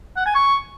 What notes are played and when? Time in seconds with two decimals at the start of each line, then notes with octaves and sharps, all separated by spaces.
0.17 F#5
0.26 G#5
0.35 C#6